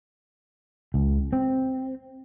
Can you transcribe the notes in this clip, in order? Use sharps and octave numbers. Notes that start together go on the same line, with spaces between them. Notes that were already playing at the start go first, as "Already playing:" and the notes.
C#2
C4